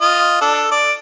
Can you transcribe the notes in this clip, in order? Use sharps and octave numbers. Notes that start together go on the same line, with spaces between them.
F4 D#5
D4 A4
D5